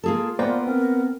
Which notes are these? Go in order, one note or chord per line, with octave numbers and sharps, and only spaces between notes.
A#3 F4 G#4 A4
A#3 B3 B4 C5 D5 G5
C4 A#4